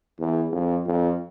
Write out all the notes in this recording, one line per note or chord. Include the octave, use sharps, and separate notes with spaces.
E2
F2
F2